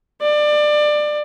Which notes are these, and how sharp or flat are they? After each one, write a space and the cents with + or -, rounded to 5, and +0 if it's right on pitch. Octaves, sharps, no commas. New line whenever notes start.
D5 +25